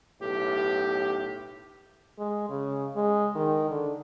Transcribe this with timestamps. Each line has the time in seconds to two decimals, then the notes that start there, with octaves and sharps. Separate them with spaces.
0.20 B1 A2 G4
2.19 G#3
2.49 C#3
2.96 G#3
3.35 D#3
3.70 D3